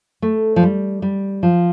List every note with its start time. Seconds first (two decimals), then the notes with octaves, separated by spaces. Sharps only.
0.22 A3
0.56 F3
0.63 G3
1.02 G3
1.43 F3